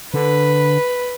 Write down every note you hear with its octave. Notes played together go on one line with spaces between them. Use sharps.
D3 B4